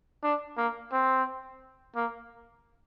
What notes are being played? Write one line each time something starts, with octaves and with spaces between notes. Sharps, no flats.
D4
A#3
C4
A#3